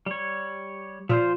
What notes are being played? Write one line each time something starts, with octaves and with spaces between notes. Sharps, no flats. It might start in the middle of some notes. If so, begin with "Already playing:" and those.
G3 C#5
A#2 F3 F4 C5